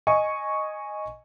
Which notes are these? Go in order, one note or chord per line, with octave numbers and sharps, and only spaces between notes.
D#5 G#5 C#6